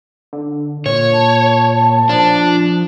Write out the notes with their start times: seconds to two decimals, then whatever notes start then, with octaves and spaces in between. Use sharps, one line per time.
0.33 D3
0.86 A#2 C#5
1.13 A5
2.09 F3 D4